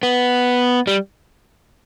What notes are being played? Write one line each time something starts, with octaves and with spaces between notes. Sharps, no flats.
B3
G3